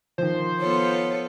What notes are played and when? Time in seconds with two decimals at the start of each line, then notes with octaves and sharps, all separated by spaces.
0.18 D#3 F3 C5
0.60 B3 F4 A4 C#5